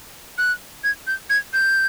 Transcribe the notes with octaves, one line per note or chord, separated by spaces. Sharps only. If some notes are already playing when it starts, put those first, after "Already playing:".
F#6
G#6
G6
G#6
G6